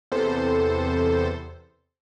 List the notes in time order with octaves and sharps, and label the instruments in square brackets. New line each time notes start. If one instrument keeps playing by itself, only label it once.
[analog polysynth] E2 C3 A4 C5